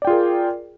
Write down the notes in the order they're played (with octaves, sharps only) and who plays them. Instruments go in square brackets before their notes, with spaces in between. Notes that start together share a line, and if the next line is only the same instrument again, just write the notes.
[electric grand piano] D5
G5
F4
G#4
A#4